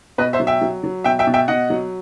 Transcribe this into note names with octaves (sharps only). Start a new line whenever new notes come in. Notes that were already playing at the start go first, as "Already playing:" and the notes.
B2 B4 D#5
C5 E5
F#3
E5 G5
F#3
F#3
B2 E5 G5
E5 G5
B2
E5 G5
B2 D#5 F#5
F#3